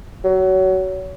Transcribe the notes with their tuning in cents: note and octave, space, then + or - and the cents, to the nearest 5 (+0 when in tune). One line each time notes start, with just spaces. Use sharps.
F#3 +25